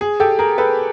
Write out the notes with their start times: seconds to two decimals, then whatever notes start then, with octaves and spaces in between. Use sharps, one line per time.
0.01 G#4
0.20 G4 A4
0.39 G#4 A#4
0.58 A4 B4